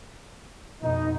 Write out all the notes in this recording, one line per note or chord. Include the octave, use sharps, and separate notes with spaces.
F2 B2 D#4